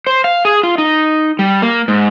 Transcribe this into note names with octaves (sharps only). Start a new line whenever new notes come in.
C5
F5
G#4
F4
D#4
G3
A#3
G#2